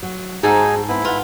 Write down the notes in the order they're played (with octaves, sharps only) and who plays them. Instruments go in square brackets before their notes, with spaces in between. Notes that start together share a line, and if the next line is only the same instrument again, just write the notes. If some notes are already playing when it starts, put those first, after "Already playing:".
[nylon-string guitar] F#3
[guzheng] G#2 A4 [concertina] D#4 G#5 [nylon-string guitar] F#4 G#4
[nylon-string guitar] B3 C4 [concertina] E4
[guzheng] F4 [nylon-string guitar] B4 F#5